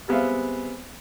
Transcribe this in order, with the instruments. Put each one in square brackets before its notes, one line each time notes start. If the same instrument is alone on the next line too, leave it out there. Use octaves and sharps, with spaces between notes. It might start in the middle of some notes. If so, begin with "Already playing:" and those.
[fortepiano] G3 G#3 B3 C4 E5 F5